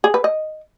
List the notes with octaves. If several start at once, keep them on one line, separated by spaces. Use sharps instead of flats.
G#4
B4
D#5